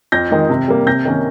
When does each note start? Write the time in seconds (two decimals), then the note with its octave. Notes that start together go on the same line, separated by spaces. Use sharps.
0.12 F2 G6 A#6
0.31 D#3 G#3 D#4
0.50 C3
0.68 G3 A#3
0.86 C3 G6 A#6
1.05 D#3 A#3 C#4